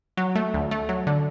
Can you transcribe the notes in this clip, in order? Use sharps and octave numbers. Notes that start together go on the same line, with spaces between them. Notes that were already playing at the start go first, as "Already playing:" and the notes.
F#3
A3
D2
A3
F#3
D3